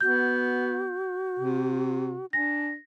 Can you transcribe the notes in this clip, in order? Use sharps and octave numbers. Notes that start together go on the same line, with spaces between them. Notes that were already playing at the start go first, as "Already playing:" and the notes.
B3 F#4 G6
C3
D4 G#5 A#6